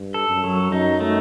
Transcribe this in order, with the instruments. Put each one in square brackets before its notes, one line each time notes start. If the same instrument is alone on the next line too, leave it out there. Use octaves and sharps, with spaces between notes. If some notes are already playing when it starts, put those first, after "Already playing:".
Already playing: [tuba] G2
[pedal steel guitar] A4
[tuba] F#2
[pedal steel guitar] F#3
[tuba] F#2 [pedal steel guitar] D#4
[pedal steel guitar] A3